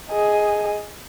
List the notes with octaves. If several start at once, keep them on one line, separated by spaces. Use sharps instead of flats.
G#4 D#5